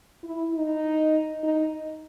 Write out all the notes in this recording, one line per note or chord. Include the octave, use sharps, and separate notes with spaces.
E4
D#4
D#4